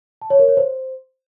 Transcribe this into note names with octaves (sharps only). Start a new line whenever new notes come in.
A5
C#5
A#4
C#5
C5